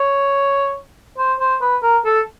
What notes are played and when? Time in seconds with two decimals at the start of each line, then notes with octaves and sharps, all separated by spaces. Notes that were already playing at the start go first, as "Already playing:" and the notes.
Already playing: C#5
1.18 C5
1.40 C5
1.61 B4
1.83 A#4
2.05 A4